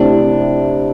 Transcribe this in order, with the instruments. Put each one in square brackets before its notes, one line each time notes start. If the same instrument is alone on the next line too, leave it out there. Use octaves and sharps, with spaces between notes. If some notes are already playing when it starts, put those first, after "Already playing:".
Already playing: [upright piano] C3 A3 C4 E4 C5 [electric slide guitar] D4